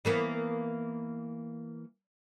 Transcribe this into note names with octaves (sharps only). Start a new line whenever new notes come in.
E3 A#3 B3